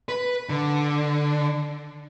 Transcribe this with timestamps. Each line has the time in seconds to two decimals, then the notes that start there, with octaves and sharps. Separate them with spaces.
0.09 B4
0.49 D3